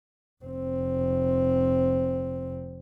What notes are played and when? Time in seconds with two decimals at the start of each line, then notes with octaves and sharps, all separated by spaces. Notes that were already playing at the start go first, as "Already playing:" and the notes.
0.45 F1 C4